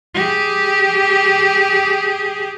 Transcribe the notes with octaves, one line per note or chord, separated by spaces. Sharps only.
G4 G#4